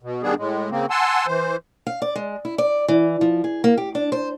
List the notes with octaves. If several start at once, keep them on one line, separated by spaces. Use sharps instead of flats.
B2
D#3 G3 B3 D4 G#4
A2 G#3
C#3 A#3 C4
F#5 G#5 A5 C6 E6
E3 C5
F5
D5
G#3
E4
D5
E3
F3
G#4
A#3
G4
D4
C5